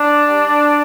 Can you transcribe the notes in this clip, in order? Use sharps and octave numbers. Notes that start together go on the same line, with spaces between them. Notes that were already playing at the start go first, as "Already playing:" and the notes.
Already playing: D4
G3